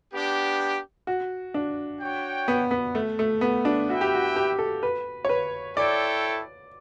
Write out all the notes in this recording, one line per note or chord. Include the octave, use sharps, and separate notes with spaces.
B3 D4 G4
F#4
D4
F#4 C#5 G5
B3
B3
A3
A3
B3
D4
E4 F#4 B4 E5 G5
G4
F#4
G4
A4
B4
C#5
B4
E4 A4 C#5 D5 G5